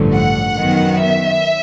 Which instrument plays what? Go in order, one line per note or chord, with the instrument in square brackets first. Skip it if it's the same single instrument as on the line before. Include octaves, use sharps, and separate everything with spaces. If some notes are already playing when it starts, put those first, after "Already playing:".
Already playing: [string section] A1 G2 D3 F3 A3
F#5
F#2 D#3 F#3 B3
E5